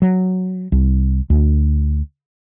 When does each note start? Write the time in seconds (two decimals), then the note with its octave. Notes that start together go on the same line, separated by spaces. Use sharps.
0.02 F#3
0.72 C2
1.30 D2